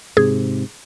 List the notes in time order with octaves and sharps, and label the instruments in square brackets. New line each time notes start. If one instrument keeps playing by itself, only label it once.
[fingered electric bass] G#2 C3 [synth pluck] G#4